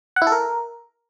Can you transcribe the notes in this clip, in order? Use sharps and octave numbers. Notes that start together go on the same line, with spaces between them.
F#5
E4
A4
A#4